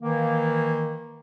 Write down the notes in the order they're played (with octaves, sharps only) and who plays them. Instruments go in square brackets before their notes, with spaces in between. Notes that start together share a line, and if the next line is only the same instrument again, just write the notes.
[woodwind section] D#3 E3 A#3